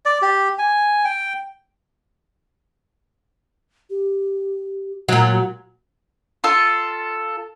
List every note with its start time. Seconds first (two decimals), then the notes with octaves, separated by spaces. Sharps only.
0.05 D5
0.22 G4
0.59 G#5
1.05 G5
3.90 G4
5.09 A#2 F#3
5.31 F#4
6.44 F4 A4